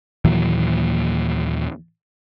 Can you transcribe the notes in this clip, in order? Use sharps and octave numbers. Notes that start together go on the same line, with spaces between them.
D#2 A#2 E3 F#3